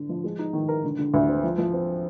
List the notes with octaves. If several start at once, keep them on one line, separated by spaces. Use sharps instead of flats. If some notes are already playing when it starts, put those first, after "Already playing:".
Already playing: D3
F3
G#3
D#4
D#3
A#4
D3
D3
D2
C4
F3
F3
C4